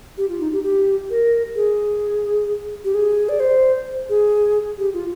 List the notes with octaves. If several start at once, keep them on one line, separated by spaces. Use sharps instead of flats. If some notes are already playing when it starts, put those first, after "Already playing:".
G4
F4
D#4
G4
G4
A#4
G#4
G4
G#4
D5
C5
G#4
G4
F4